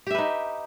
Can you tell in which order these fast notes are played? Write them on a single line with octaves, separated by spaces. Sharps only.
G4 E5 B4 D#4